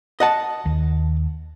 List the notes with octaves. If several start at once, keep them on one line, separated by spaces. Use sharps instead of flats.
D#5 F#5 A5
D#2